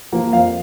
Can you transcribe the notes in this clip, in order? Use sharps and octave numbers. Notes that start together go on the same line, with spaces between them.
F3 A#3
F2 F5